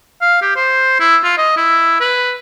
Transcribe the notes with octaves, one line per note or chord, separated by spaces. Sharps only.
F5
G4
C5
E4
F4
D#5
E4
B4